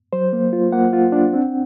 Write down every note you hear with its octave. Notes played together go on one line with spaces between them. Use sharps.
F#3 C5
A#3
F4
A#3 F#5
F4
D4
C4